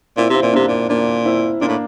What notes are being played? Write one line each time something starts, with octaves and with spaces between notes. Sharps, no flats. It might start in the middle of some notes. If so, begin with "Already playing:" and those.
A#2 C4 E4
C3
C4 E4
A#2
C3 A#3 D4
A#2
A#2 A#3 D4
C4 E4
A#2 A#3 D4
A2